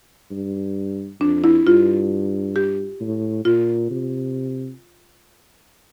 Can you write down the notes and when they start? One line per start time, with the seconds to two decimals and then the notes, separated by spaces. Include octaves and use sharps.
0.31 G2
1.21 F2 D4
1.44 E4
1.66 G2 F4
2.56 G4
3.01 A2
3.45 A#2 F4
3.91 C3